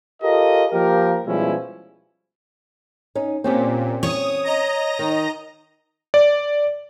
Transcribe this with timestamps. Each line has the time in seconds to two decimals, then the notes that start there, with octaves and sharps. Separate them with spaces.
0.23 F4 G4 A4 A#4 D#5
0.72 F3 A#3 G4 A#4
1.26 B2 F3 G3 G#3 C#4 E4
3.15 C#4 D#4
3.44 A#2 C4 C#4 G4
4.03 C#5 D#6
4.43 D#5 A#5 A#6
4.99 D#3
6.14 D5